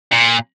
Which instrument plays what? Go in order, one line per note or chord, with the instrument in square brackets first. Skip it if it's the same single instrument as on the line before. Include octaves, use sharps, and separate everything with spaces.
[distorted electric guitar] A#2